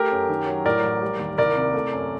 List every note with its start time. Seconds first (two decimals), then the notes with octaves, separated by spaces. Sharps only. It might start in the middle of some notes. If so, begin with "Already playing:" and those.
Already playing: A3 G4 A#4
0.11 F#2
0.29 D#3
0.47 F#3
0.65 A2 A#4 D5
0.83 A1
1.01 G3
1.19 D#2
1.38 C2 A#4 D5
1.57 C3
1.74 A3
1.92 F#2